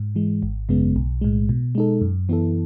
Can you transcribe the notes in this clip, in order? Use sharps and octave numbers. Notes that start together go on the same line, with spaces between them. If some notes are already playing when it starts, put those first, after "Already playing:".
Already playing: G#2
E3 G#3
G#1
F#2 C#3 G#3 B3
B1
A2 G#3
B2
G#3 D#4 A4
F#2
E3 B3 E4 A4